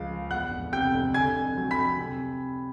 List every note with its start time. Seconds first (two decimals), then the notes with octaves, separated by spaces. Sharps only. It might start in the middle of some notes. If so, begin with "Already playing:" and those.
Already playing: C#2 C#3 F3 F5
0.10 G#3
0.30 E2 F#5 F#6
0.51 F1
0.72 C3 G5 G6
0.94 F1
1.14 D3 G#5 G#6
1.36 F2
1.57 F#3
1.71 B5 B6
1.78 F2
1.99 C3